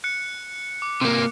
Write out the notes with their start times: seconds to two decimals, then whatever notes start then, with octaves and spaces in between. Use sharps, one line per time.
0.04 F#6 C#7
0.82 D6
1.01 C3 A#3